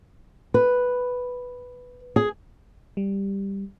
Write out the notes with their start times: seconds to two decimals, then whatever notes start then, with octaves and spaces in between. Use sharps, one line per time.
0.54 B4
2.16 G#4
2.97 G3